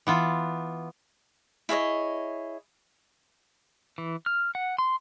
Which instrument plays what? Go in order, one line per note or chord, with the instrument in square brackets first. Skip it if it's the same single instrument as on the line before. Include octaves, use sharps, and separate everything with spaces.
[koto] E3 B3 F4
[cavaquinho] E4 G#4 C#5 D#5
[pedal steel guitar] E3
F6
F#5
C6